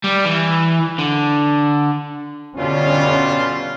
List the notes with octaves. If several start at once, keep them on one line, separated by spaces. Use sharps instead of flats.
G3
E3
D3
B2 D3 G3 C#4 F4